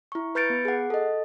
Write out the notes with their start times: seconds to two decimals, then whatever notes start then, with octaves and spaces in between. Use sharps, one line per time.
0.12 E4 C#6
0.35 B4 B5 G6 A6 C#7 D7
0.50 B3
0.65 G#4 F#5
0.90 A4 D#5